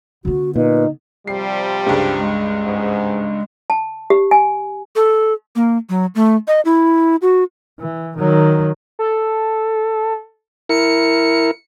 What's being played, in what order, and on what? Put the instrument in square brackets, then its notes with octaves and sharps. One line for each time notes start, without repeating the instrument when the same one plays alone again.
[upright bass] D3 B3 [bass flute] F#4
[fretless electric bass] A#2 [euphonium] D#4 [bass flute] B4
[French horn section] C3 F3 G3 [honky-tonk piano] C7
[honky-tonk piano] C#2 G2
[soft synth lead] G#3
[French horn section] G#2
[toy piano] A5
G4
G#5
[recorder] A4
A#3
F#3
A3
D#5
E4
F#4
[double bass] E3
D#3 F#3
[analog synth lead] A4
[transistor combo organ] E4 A#4 [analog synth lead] C#7